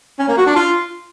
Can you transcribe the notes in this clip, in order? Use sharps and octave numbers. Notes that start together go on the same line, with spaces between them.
C#4
A#3
F#4
D4
F4